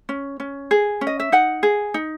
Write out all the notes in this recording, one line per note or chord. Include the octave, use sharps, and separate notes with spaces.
C#4
C#4
G#4
C#4
D#5
E5
D#4 F#5
G#4
D#4